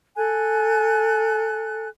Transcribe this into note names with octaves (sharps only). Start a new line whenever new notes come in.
A4 G#5 F#6